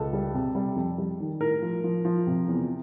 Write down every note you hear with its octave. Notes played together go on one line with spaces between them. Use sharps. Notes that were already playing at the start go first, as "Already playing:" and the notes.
Already playing: C#2 A4
G3
C3
G3
F2
G3
D#3
A2 A#4
F3
F3
F3
C3
E2